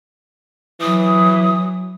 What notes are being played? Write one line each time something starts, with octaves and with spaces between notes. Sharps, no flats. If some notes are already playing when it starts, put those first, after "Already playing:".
E3 F#3 D#6